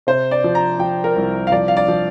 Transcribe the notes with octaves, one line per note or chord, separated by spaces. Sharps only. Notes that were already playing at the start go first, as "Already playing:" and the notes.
C3 C5
D5
F3
A#5
F3 G5
A#4
C2
F5
F3 D5
F5
D5
F3